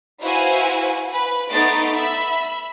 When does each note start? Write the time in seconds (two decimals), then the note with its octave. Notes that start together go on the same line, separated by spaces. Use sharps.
0.21 E4 F#4 B4 C5 F5 G#5
1.12 B4
1.50 A3 B3 D#4 C6 A6 D7
1.95 E5 B5